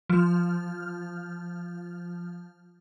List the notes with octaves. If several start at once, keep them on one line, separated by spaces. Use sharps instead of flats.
F3 F6